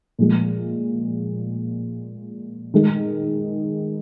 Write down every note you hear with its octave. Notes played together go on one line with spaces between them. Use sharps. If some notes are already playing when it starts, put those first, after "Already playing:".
A#2 F3 G#3
D#3 G#3